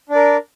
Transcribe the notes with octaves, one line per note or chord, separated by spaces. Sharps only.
D4 A#4 D5